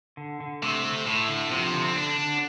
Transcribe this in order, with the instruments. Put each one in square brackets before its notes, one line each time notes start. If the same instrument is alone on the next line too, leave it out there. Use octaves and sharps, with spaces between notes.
[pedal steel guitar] D3
D3
[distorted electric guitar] C3 [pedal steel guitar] A3
[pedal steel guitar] A3
[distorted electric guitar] A2 [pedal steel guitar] A3
[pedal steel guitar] D3
[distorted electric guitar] C3 [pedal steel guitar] F3
[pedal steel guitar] D3
[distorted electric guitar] C4
[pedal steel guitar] D3 [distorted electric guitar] D4
[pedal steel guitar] D3